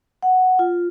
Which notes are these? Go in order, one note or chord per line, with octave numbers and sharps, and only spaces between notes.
F#5
F4